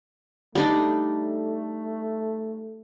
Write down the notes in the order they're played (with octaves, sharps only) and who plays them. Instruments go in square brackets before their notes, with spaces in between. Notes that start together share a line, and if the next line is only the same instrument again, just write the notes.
[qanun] G3 D4 D#4 [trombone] A3